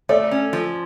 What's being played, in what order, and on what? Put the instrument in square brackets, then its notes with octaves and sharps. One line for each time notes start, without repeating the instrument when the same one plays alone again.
[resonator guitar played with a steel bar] A3 [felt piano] D5
[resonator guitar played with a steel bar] C#4
F3